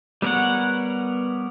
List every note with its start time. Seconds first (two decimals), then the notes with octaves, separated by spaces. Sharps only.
0.22 G3 B3 A#4 C#5 F#5